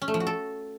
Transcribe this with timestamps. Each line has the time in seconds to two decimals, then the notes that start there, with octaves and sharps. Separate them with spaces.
0.02 C#4
0.08 A3
0.14 F3
0.20 F#4
0.27 A4